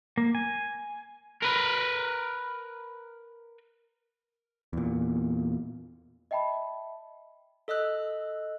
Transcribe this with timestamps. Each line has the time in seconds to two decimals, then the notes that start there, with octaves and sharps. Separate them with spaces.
0.18 A#3
0.35 G#5
1.42 A#4 B4
4.73 E2 A#2
6.31 D#5 E5 G5 A5 B5
7.68 A4 D#5 E6 F#6